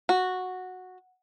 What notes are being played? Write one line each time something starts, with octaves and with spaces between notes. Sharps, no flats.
F#4